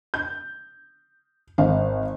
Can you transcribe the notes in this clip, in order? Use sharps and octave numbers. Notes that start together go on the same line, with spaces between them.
G6
G#1 F5